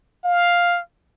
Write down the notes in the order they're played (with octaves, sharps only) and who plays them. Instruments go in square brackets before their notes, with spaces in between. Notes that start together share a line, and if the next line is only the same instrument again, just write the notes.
[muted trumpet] F5